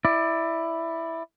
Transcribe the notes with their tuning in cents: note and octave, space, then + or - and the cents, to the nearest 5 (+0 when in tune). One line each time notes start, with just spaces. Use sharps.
E4 +0 D5 +20